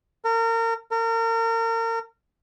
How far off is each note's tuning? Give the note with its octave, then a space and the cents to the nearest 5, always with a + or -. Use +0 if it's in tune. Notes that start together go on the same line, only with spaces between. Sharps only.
A#4 -35
A#4 -35